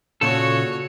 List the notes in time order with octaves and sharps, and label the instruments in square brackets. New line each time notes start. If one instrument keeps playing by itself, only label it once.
[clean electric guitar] A#2 C#3 A4 [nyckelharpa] F#4 C#5